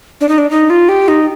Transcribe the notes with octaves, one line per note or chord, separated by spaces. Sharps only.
D4
D#4
D4
D#4
F4
G4
D#4